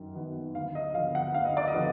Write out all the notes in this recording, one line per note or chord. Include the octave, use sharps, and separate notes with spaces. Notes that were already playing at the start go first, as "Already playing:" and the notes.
Already playing: F#2 D#3
D#3 F#3 B3
D2 F5
D#5
D3 F3 B3 F5
F#5
D2 F5
D#5
D5
D#5
D3 F3 B3